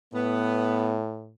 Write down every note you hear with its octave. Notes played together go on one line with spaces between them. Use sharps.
A2 B3